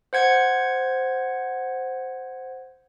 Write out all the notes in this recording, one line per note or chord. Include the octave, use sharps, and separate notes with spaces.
C5 F#5 G#6 C#7